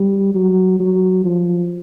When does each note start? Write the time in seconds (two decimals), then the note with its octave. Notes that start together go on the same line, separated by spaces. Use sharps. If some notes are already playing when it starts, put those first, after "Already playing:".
Already playing: G3
0.34 F#3
0.80 F#3
1.24 F3